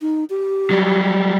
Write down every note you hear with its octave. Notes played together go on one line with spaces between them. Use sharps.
D#4
G4
F#3 G3